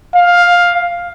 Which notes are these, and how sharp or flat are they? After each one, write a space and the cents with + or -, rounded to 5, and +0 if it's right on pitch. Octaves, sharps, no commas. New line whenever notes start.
F5 +10